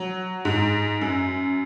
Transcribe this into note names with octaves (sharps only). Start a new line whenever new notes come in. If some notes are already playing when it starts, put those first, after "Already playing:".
Already playing: F#3
G#2
F#2